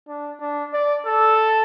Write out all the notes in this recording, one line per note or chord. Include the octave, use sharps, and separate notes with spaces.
D4
D4
D5
A4